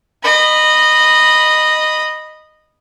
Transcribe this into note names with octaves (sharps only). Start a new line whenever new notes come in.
D#5 B5